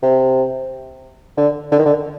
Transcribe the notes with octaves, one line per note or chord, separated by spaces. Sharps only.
C3
D3
D3
D#3
D3